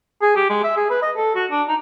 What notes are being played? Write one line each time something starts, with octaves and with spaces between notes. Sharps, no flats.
G#4
G4
G#3
E5
G#4
B4
D#5
A4
F#4
D4
D#4